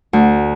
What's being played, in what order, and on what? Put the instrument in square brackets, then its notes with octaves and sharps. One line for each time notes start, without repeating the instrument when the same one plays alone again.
[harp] D2